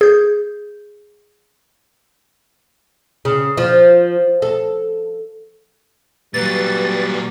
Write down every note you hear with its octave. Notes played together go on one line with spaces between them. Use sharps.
G#4 G6
C#3
F3
A4
A#2 F#3 G3 B4 A6